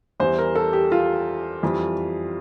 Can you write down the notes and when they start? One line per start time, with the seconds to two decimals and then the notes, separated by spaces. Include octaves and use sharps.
0.20 E2 E3 G3 C5
0.38 A#4
0.56 A4
0.73 G4
0.92 F4
1.63 F2 E3 G3